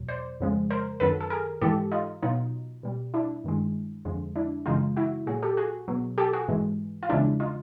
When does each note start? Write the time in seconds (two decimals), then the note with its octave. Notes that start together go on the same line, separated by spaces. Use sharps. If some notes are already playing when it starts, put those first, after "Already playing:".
Already playing: E2 B2 F#3
0.08 C5 D5
0.40 F2 C#3 F3 G#3
0.70 A#4 C5
1.00 F#2 D#3 F#3 A4 B4
1.21 A4
1.30 G#4 A#4
1.61 G#2 E3 G#3 G4 A4
1.92 D#4 F4
2.22 B2 F#3 D#4 F4
2.83 B2 G3
3.14 D4 E4
3.44 G2 D#3 G#3
4.05 F2 D3 F3 G#3
4.36 D4 E4
4.66 F#2 C#3 E3 G#3 D#4 F4
4.96 E4 F#4
5.27 A#2 F#3 F#4 G#4
5.42 G4 A4
5.57 F#4 G#4
5.88 B2 F#3
6.18 G4 A4
6.33 F#4 G#4
6.48 G#2 E3 G#3
7.03 F4
7.09 E2 C#3 F3 G#3 D4 E4
7.40 D#4 F4